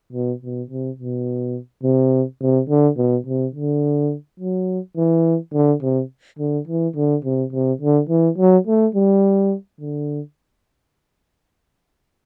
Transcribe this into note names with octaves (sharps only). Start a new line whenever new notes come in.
B2
B2
C3
B2
C3
C3
D3
B2
C3
D3
F#3
E3
D3
C3
D3
E3
D3
C3
C3
D3
E3
F#3
A3
G3
D3